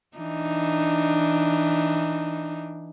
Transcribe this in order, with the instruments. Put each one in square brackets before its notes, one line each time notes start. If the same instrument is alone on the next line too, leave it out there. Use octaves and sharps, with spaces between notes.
[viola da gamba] E3 D4 D#4